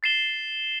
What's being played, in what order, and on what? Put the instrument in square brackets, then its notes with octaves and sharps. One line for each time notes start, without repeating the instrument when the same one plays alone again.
[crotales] A6 C7 E7 G7